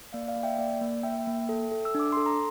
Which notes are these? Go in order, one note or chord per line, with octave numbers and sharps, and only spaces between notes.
A#3 D5 F5
D5 F5
A#3
E5 G5
A#3 D5
A#3
A#3 E5 G5
A#3
A4
A4
E6
D4 D6
A4 C6
A#5